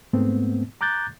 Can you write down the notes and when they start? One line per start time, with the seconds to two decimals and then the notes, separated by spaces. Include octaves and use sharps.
0.13 G#2 A3 B3 C4
0.81 A#5 D6 F#6 G6 A6